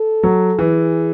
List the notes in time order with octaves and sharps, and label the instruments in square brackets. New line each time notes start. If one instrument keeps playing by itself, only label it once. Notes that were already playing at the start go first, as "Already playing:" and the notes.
Already playing: [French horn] A4
[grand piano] F#3
[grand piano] E3 [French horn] G#4